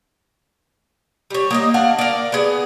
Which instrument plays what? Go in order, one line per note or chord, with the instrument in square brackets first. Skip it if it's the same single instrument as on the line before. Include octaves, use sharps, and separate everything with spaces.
[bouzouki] G3 C#5
A#3 D#4 D#5
D4 F5 F#5
A#4 D5
B3 G#4